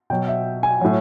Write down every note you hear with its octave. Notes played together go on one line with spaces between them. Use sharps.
B2 F#3 G5
E5
G#5
A2 F#3